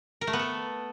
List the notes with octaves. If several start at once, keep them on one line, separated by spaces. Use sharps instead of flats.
A#4
A3
B3
A4